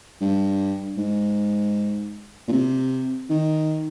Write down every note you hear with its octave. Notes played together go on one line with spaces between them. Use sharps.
G2
G#2
A#2
C3
D#3